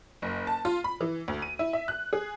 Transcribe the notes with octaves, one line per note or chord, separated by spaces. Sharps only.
F#1
A5
F4
B5
E3
D2
D#7
E4
E5
F#6
G#4